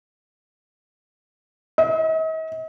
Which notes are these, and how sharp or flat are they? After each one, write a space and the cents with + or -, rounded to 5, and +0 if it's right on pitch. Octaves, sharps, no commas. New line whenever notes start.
D#5 +45